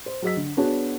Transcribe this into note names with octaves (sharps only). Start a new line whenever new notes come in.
C5
F#3 G#4 D#5 E6 B6
D3
B3 D4 F#4 G#4 C#5 A5